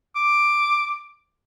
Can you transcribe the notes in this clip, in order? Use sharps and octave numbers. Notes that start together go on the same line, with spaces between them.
D6